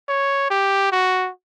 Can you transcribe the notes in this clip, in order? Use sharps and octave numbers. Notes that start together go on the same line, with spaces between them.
C#5
G4
F#4